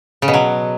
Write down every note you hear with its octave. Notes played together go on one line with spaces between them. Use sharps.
C#3
B2
F#3